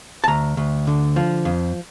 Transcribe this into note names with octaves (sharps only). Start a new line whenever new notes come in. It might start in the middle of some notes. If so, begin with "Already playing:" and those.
A5
D2 A#5
D2
D3
F3
F2